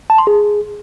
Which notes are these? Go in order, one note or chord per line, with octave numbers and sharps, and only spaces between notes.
A5
C6
G#4